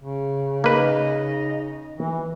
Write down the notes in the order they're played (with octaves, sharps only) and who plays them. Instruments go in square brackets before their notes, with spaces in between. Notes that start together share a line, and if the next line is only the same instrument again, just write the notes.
[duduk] C#3
[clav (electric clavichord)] A#3 B4 [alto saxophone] D#4
[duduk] E3